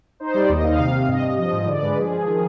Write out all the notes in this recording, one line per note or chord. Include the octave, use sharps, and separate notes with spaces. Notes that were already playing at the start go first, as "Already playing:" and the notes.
D#4 C5
G3 D5
D#2 D#5
D#4 F5
D#5
C3 F5
C3
F5
G2 D#5
G2
F3 D#5
G#2 D#5
D3 D5
G#3 B4
F3 G#4
F3
D#3 G#4